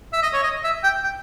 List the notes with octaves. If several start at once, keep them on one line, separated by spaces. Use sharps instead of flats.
E5
D#5
C#5
D#5
E5
G5
G5